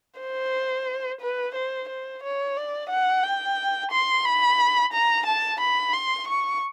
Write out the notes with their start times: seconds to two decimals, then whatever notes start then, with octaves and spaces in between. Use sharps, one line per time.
0.20 C5
1.21 B4
1.55 C5
1.89 C5
2.23 C#5
2.57 D5
2.90 F#5
3.23 G5
3.91 C6
4.25 B5
4.93 A#5
5.26 A5
5.60 B5
5.93 C6
6.28 C#6